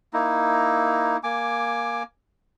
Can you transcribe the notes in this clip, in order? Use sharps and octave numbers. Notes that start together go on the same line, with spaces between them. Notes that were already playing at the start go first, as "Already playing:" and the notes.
A#3 D#4 E4
A#3 G#5 D6